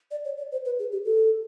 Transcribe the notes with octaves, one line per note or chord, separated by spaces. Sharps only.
D5
C#5
D5
C5
B4
G#4
G4
A4